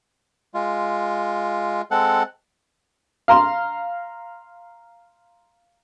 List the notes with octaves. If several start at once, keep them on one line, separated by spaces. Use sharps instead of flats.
G#3 F4
G#3 C4 A4 F#5
F5 A#5 C6